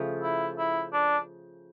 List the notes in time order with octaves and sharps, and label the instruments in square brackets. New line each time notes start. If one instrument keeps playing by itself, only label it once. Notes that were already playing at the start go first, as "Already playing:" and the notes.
Already playing: [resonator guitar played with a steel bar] C#3 F3 A3
[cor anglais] E4
E4
D4